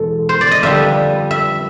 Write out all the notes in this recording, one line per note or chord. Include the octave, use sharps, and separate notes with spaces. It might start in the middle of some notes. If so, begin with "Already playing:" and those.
Already playing: E2 B2 G#3 A4
C5
D5
D#5
F2 D3 G3 B3 E5
E5